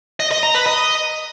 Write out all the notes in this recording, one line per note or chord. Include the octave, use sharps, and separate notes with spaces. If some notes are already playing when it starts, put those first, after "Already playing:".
D#5
D#5
A#5
B4
D#5